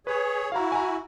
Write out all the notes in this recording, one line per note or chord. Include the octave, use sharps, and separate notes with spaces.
G#4 B4 C#5
E4 F#4 F5 A#5
G#5 A#5